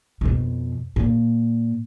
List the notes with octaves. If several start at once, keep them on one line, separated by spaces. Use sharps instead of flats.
F2 B2
A#2